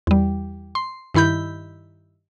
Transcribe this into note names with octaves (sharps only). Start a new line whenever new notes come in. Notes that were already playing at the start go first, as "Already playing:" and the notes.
E2 G3
C6
G2 D#3 E4 B5 G6